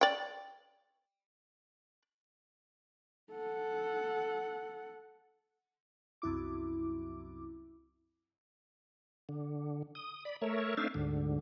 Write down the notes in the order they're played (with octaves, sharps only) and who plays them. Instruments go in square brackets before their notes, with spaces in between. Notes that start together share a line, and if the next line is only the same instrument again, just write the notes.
[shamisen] D5 G5
[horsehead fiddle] A4 F#5
[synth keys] C2 F#2 E4 D6
[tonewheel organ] D3
D#6
D5 B5
A3 A#4 C#5 E5
A3 C4 D4 D#4 E5 F5
D2 G#2 D3